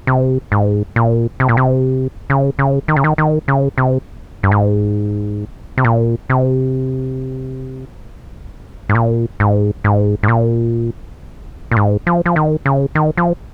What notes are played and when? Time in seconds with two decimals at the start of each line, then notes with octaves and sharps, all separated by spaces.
0.07 C3
0.52 G#2
0.96 A#2
1.40 C3
1.49 A#2
1.57 C3
2.30 C#3
2.59 C#3
2.88 D#3
2.96 C#3
3.04 D#3
3.18 D#3
3.48 C#3
3.78 C3
4.43 G2
4.51 G#2
5.78 C3
5.84 A#2
6.30 C3
8.89 G#2
8.95 A#2
9.40 G#2
9.84 G#2
10.23 G#2
10.28 A#2
11.71 A#2
11.77 G#2
12.07 F3
12.26 F3
12.36 D#3
12.66 C#3
12.95 D#3
13.17 F3